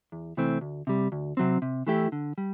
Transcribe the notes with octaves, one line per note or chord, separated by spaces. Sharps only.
E2
C3 E3 A3 C4
D2
C3 G3
D2
C3 F#3 C4
C3
E3 A3 E4 G4
D3
G3